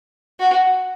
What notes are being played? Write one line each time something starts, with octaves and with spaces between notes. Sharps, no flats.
F#4